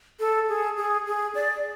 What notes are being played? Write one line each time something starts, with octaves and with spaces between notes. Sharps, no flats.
A4
G#4
G#4
G#4
D5